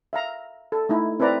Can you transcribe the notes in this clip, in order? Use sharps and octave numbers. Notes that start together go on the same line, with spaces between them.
E5 F5 A#5
A4
A3 D#4 E4
C4 E4 B4 D5 A#5